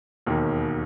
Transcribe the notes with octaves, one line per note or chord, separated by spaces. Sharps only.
E1 D#2 D#3